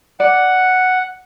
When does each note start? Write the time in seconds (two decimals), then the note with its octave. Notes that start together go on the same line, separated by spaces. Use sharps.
0.20 D5 F#5